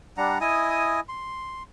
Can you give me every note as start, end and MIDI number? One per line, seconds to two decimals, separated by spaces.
0.17 0.38 55
0.17 0.38 62
0.17 0.38 78
0.17 0.38 82
0.41 1.00 64
0.41 1.00 75
0.41 1.00 80
0.41 1.00 87
1.09 1.63 84